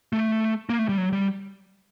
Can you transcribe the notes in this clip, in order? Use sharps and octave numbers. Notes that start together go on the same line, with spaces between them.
A3
A#3
A3
G3
F#3
G3